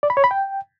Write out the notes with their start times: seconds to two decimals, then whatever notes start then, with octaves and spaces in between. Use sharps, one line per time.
0.03 D5
0.10 B5
0.17 C#5
0.24 B5
0.31 G5